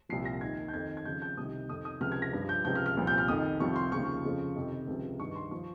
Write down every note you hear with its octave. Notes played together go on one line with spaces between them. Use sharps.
C2 A#2 F3 C7
A#6
D#2 D#3 G#6
G6
F2 D#3 G#6
G#6
F2 C#3 F3 G6
G6
C2 C3 D#3 D#6
F2 D#3 D#6
D#6
C#2 C3 F3 F6
G#6
A#6
G2 F3
G6
C#2 C3 F3 G6
F6
F6
C2 A#2 F3
G6
F6
F2 D#3 D#6
C2 C3 F3 C#6
C6
D#2 C#3 F3 C#6
F2 C#3 F3
F2 C3 D#3
C#2 C3 F3
G2 D#3 C#6
C6
F3 C#6